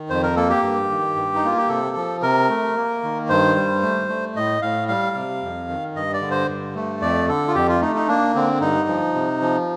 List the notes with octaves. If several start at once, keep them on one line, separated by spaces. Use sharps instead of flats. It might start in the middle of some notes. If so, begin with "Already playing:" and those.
Already playing: D#3
F2 C5
A#4
A#3 A4
G4
G2
D#3
G2
D#4
A#3 F4
G4
C3 A4
F3
C3 A#4
A3
A#3
D#3
G2 C5
G3
A3
A3
A2 D#5
A2 F5
G3 F5
C3
F2
D#3
G2 D#5
D5
D3
C5
G2
A3
F2 D5
D3 A4
F4
F2 G4
F4
A3 D#4
D#4
A#3 D4
D3 C4
G2 D#4
F3
C3
F3